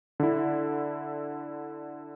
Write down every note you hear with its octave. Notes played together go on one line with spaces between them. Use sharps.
D3 E4